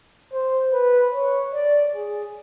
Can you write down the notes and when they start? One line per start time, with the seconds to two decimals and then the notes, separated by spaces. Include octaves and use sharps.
0.32 C5
0.73 B4
1.14 C#5
1.54 D5
1.95 G#4